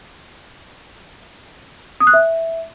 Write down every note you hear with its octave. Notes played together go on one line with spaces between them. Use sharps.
D#6
F#6
E5